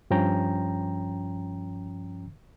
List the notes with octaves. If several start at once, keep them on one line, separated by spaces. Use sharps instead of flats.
G2 F3 C#4 G5 A#5